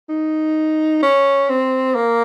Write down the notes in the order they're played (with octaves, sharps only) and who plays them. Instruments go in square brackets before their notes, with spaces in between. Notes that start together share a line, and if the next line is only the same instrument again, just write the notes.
[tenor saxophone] D#4
C#4
C4
A#3